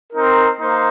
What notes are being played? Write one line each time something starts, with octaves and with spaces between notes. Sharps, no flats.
C4 D#4 A#4
A#3 D#4 C5